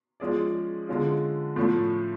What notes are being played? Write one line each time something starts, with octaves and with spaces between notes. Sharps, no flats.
F3 G#3 C#4 G#4 D5
D3 G#3 C#4 F4
A2 F3 A3 C#4